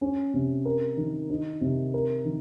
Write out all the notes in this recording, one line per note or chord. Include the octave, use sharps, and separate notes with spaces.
C#4
C3
A#4
D#3
D#4
C3
A#4
D#3